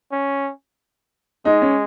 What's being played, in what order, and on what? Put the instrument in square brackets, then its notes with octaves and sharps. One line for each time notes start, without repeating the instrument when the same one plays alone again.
[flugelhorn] C#4
[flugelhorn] G#3 [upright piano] D#4
[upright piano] C#4